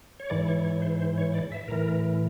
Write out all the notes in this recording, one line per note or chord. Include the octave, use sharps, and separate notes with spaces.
C#5
G#2 E3 D5
C#5
C#5
C5
C5
C#5
D5
E5
A2 E3 A#4